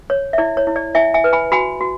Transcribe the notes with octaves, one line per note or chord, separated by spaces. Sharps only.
C#5
E5
E4 D5
C#5
E4
D5
E4 E5 G#5
E5 G#5
B4
G#5 B5
F#4 G#5 B5
F#4